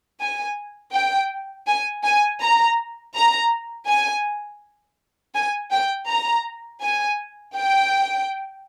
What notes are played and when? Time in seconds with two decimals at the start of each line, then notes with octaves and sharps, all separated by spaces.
0.21 G#5
0.94 G5
1.68 G#5
2.04 G#5
2.42 A#5
3.15 A#5
3.89 G#5
5.35 G#5
5.72 G5
6.08 A#5
6.82 G#5
7.56 G5